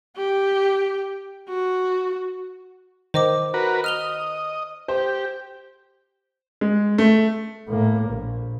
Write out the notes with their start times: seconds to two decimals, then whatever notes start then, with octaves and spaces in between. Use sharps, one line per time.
0.16 G4
1.48 F#4
3.14 D#3 C5 D#5 D6
3.54 F#4 A#4 B4
3.84 D#5 F6 F7 G7
4.88 G4 C5
6.61 G#3
6.98 A3
7.68 A2 A#3
8.10 A#1